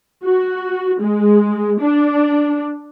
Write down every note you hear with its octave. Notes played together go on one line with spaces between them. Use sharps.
F#4
G#3
D4